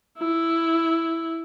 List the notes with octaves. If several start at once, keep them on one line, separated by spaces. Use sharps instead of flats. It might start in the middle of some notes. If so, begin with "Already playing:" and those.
E4